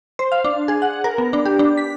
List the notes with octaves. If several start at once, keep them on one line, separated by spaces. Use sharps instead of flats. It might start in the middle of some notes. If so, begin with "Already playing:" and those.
C5
F5
D4
G#4
F#5
A#4
B3
D4
G4
D4
B6